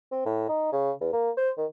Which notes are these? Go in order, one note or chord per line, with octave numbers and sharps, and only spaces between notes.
C4
A2
D#4
C#3
E2
A#3
C5
D#3